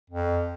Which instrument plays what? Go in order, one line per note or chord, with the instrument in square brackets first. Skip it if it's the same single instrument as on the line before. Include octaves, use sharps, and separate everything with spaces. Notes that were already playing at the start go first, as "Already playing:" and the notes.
[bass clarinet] F2